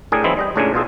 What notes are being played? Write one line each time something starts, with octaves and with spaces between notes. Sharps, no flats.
A2 D4 G#4 A#4 G5 G#5
E3 F#3 G#3 C4 D#4 E4
G3 D#5 G5
C#2 A2 C#3 D4 A#4 G#5
B2 F4 G#4 A4